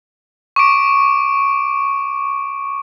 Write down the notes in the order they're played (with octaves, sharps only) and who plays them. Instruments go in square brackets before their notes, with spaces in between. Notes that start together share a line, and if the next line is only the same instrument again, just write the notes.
[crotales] C#6 D6 D7